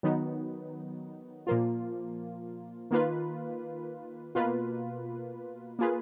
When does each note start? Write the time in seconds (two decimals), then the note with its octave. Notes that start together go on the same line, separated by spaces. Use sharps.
0.03 D#3 F#3 B3 D#4
1.47 A#2 F3 A#3 F4
2.91 D#3 A#3 F4 B4
4.35 B2 A#3 F4 B4
5.79 A#3 F4 G#4 B4